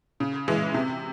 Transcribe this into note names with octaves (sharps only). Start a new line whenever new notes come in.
C#3
E3 G#3
C3